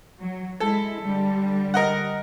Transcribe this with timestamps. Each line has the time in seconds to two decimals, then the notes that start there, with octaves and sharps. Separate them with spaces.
0.21 F#3
0.60 G#3 E4 A4
1.02 D3 G3
1.74 A#4 D#5 F#5